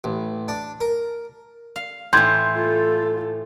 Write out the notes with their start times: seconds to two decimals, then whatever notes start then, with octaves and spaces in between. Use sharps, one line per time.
0.04 A1
0.48 D4
0.81 A#4
1.76 F5
2.13 A2 E3 C6 G6 G#6
2.56 F4 A4